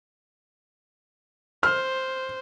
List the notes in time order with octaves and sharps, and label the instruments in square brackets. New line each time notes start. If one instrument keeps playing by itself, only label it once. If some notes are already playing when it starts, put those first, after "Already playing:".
[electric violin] C5 [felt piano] F6